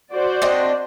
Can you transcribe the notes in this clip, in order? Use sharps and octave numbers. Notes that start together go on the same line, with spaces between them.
F#4 C5 D5
C4 D4 D#5